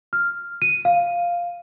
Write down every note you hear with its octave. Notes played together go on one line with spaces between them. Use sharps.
F6
D#7
F5